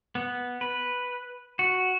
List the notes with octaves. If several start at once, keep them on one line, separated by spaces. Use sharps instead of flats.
B3
B4
F#4